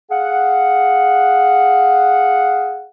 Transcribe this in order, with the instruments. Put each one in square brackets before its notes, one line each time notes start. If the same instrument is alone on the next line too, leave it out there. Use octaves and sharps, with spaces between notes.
[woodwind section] G#4 F5 F#5